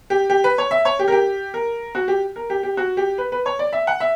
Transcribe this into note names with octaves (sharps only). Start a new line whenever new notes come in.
G4
G4
B4
C#5
E5
C#5
G4
A#4
G4
A#4
F#4
G4
A#4
G4
G4
F#4
G4
B4
B4
C#5
D5
E5
F#5
E5